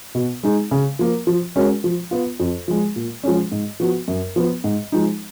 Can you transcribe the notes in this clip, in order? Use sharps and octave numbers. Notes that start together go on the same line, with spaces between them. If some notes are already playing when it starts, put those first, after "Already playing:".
B2
G#3 D#4 G#4
C#3
F3 A#3
F3
G#3 C#4 F#4 A#4
F3
B3 F4
F2
F3 G#3
A#2
F3 G#3 C#4
G#2
F3 B3 F#4
F#2
F3 B3
G#2
F3 G#3 D#4